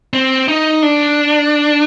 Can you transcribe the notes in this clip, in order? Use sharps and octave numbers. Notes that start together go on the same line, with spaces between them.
C4
D#4
D4